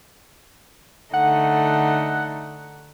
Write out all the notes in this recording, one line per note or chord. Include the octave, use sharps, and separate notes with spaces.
D3 A3 D#4 F#5